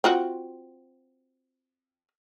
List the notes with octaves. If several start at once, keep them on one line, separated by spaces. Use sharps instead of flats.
C4 F4 F#4